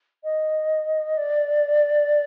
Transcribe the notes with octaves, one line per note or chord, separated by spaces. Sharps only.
D#5
D5